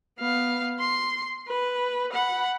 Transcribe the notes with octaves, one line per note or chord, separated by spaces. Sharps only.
B3 F5
C6
B4
F#5 B5